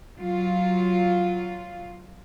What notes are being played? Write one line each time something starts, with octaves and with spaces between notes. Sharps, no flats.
F#3 F4